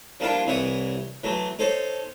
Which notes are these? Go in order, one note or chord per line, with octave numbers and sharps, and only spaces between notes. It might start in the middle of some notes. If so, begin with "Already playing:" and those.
F3 G3 A#3 D4 E4 F4
C2 E3 E4 C#5 D#6
E3 F#3 A3
D#4 A4 C5 C#5